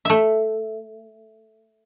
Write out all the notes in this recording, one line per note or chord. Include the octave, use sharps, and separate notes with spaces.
A3 E5